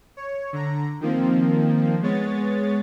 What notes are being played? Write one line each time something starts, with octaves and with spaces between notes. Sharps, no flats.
C#5
D3 A#5
D#3 F3 A#3 C4
G#3 B3 C#5 A6